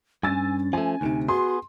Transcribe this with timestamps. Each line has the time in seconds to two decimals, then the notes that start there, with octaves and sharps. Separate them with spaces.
0.23 G2 C#4 G#5 E6 A6
0.73 F3 A3 G#5
1.01 D2 A2 C3 D#4
1.28 B3 F#4 G#4 C6